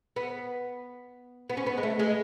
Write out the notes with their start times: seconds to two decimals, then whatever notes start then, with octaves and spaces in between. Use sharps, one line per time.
0.16 B3
1.50 B3
1.57 C#4
1.66 B3
1.77 G#3
1.83 A3
1.99 G#3